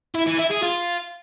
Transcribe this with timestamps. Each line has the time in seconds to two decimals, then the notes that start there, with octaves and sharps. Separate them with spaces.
0.15 E4
0.27 E3
0.39 E4
0.51 G#4
0.63 F4